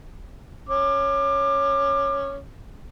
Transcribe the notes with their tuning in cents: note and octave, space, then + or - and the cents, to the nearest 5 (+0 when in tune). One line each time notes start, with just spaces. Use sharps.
C#4 +0 D6 +25